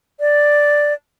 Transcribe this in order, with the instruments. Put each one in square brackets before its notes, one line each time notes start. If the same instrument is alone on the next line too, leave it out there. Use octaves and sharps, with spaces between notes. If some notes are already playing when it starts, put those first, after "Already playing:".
[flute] D5